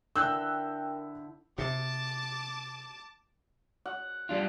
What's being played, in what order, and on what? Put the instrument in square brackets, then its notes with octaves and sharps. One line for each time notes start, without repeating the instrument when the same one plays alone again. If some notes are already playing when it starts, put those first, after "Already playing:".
[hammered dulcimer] D3 E4 [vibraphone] A#4 G5 [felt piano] E6 F#6 G6
[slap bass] C3 [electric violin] A5 D6
[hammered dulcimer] F#5
[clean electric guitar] G3 D4 F4